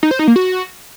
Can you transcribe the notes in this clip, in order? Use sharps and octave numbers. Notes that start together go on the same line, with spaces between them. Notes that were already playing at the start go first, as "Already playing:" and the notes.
D#4
C5
D#4
A#3
F#4